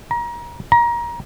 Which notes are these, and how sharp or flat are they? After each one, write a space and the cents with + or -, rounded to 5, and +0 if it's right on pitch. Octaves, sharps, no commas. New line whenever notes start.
A#5 +30
A#5 +25